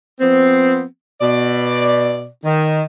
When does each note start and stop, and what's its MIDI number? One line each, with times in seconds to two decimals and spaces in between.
0.20 0.83 53
0.20 0.83 59
0.20 0.83 60
1.21 2.26 47
1.21 2.26 74
2.44 2.82 51